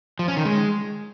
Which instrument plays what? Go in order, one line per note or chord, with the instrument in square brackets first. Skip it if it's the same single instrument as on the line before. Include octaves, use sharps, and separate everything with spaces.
[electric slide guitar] F3
C#4
D#3
G#3